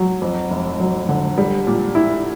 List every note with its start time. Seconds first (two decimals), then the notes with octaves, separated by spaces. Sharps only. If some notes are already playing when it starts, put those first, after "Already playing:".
Already playing: F#3
0.22 F2
0.50 F1
0.80 F#3
1.09 D3
1.38 G3
1.67 A#2
1.95 E4